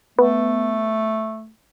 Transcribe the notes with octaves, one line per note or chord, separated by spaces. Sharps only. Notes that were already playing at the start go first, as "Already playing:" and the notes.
A3 B3